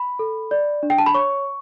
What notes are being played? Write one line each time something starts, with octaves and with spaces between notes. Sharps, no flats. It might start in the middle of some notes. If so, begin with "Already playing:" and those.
Already playing: B5
A4
D5
D4
G5
A5
B5
C#5 C#6